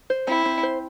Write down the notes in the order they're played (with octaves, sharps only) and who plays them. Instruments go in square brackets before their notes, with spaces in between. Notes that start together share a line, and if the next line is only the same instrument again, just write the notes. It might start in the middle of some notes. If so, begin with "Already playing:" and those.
[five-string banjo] C5
[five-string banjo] C4 [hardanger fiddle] E4
[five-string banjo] C4
C5